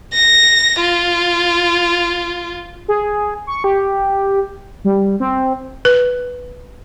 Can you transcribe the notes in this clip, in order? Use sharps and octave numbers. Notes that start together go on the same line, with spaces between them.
A#6
F4
G#4
C#6
G4
G3
C4
B4